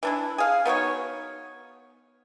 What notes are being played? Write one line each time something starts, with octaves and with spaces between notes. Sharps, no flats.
E3 D4 E4
G#4 F5
B3 D#4 F#4 C#5